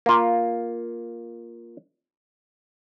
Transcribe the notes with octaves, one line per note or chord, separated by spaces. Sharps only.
A#3 F4